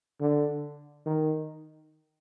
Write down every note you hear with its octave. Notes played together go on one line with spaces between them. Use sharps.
D3
D#3